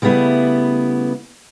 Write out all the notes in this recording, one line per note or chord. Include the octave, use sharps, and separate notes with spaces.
C#3 G3 A3 B3 E4